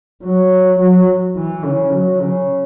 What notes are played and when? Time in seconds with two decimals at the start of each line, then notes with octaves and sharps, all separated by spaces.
0.23 F#3
0.80 F#3
1.37 E3
1.65 C#3
1.93 F#3
2.21 C#3